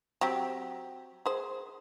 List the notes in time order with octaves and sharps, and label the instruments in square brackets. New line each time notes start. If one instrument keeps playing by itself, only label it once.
[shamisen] F#3 C4 G4
G#4 C5